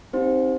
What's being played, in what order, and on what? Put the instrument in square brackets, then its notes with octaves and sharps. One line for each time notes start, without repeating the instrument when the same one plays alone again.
[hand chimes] C4 D#4 G4 C5